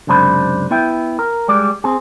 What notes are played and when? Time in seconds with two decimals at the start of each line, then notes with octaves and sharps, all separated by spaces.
0.07 C#2 F#2 C3 D4 C5 B5
0.71 B3 E4 E5 G5
1.19 A#4
1.48 G3 G#3 D5
1.84 C4 G#4